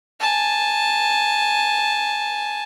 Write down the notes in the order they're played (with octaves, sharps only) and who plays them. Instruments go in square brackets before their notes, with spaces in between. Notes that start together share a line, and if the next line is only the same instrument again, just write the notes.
[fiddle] G#5 A5